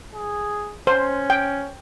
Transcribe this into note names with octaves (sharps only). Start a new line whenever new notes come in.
G#4
C#4 C5
G5